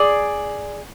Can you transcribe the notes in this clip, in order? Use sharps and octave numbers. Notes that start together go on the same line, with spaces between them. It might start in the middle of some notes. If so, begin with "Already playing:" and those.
Already playing: G#4 D5